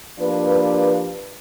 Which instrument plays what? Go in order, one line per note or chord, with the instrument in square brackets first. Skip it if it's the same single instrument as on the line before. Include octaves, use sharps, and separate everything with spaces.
[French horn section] F3 A#3 D4 G4 B4